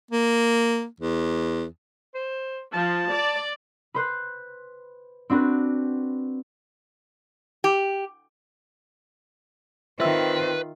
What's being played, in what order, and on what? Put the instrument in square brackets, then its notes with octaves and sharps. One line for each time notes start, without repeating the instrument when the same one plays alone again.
[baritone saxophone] A#3
E2
[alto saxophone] C5
[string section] F3 [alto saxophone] A5
[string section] D5
[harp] B4 C5 F#6
C4 D4 F#4 B4
[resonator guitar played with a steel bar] G4
[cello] D#3 F4 [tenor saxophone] C4 [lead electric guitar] B4 [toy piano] E5 E6